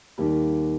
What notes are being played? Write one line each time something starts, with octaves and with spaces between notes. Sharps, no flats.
D#2 D#3 G3 A#3